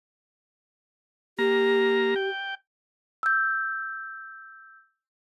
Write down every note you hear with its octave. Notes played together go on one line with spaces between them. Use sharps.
A#3 G4 A#5
G5
E6 G6